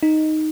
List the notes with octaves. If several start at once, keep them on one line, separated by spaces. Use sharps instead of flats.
D#4